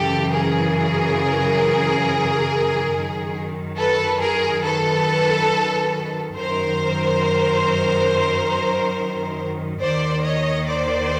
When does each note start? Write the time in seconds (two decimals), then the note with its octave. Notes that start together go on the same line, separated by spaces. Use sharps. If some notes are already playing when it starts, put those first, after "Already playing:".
Already playing: F#2 C#3 E3 G4 A4
0.32 G#4 A#4
2.91 F#2 D#3
3.77 A4 B4
4.20 G#4 A#4
4.63 A4 B4
6.35 F#2 D#3 A#4 C5
9.80 D#2 D#3 C5 D5
10.24 C#5 D#5
10.67 C5 D5